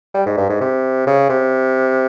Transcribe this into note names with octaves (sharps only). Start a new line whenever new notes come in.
G3
G#2
G2
G#2
C3
C#3
C3